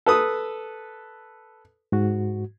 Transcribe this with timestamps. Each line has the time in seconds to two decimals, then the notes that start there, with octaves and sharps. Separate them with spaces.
0.06 A4 B4 D#6
1.92 G#2 F#4